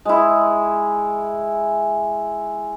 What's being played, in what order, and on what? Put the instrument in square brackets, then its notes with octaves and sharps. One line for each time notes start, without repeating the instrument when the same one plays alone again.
[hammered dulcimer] G#3 E4